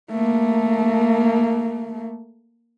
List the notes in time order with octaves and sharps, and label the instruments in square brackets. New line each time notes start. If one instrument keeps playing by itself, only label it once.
[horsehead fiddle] A3 A#3